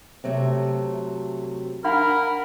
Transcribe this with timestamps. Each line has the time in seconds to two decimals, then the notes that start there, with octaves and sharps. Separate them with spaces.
0.24 C3 F#3 A3
1.84 D4 A#4 F5 F#5 B5